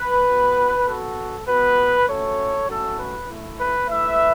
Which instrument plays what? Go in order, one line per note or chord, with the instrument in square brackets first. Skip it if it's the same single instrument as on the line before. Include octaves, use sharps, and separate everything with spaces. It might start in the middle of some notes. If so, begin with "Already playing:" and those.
Already playing: [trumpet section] B4
B3 F#4
B3 F#4 A4
B3 F#4 B4
A3 C#4 F#4 A4 C#5
A3 C#4 F#4 A4
B4
A3 E4
B4
A3 E4 B4 E5